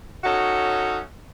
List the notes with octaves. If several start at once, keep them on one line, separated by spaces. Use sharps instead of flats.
C#4 D#4 F#4 A4 C#5 E5